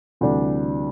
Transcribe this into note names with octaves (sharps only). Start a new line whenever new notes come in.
D2 C3 E3 G3 D4